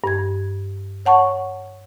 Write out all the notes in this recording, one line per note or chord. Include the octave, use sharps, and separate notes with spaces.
G2 G#6
C#5 F#5 A5 C#6